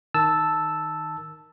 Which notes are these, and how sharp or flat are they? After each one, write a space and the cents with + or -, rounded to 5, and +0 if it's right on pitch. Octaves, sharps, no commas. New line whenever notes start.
D#3 +0 A5 +0 E6 +0